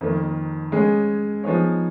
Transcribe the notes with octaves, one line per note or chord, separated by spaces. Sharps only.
F2 D#3 A#3
G#3 C#4 G#4
F3 B3 D#4 G#4 C#5